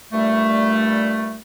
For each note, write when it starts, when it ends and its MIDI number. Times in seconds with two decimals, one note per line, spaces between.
0.13 1.37 43
0.13 1.37 46
0.13 1.37 55
0.13 1.37 57